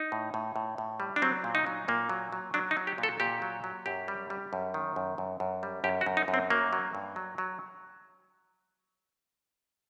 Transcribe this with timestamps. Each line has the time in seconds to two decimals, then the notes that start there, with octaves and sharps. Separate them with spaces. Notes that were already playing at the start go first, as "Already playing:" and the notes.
Already playing: D#4
0.12 A2
0.34 A2
0.56 A2
0.78 A2
1.00 G3
1.16 D4
1.22 F#3 C4
1.44 A#2
1.55 D#4
1.66 F#3
1.88 A#2 A#3
2.09 F#3
2.32 F#3
2.54 F#3 D4
2.71 D#4
2.77 F#3
2.87 G4
2.98 A#2
3.03 A4
3.20 A#2 G4
3.42 F#3
3.64 F#3
3.86 F#2 G4
4.08 G3
4.30 G3
4.53 F#2
4.74 D#3
4.96 F#2
5.18 F#2
5.40 F#2
5.63 G3
5.84 F#2 G4
6.01 F#4
6.06 F#2
6.17 D#4
6.28 F#2
6.34 C4
6.50 F#3 A#3
6.73 F#3
6.95 G2
7.16 F#3
7.38 F#3